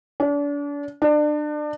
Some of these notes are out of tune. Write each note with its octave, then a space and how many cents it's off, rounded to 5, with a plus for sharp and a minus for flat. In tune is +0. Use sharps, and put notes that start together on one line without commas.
D4 -35
D4 +30